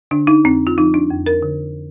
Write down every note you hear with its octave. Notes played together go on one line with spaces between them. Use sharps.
D3 D4
D#4
F2 C4
F4
F3 D#4
D4
F2
A#4
D3